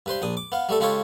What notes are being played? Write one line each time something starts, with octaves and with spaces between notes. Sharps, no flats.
G2 B4 C5 C6
A#1 D4 D#6
D6
B3 F5
G3 A3 A4
C#3 G#3 F4 G4 A4 C#5